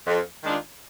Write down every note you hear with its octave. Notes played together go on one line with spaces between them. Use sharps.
F2
D#3 G#3 D4 F4